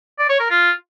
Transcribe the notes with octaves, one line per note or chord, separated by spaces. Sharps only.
D5
C#5
A#4
F4